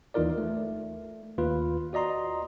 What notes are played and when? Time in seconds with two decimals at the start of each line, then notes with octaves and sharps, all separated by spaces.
0.14 D#2 E3 D#4 F4 A#4 D5
0.38 A3
1.38 D#2 F4 B4
1.93 F#4 D5 D#5 A#5 C6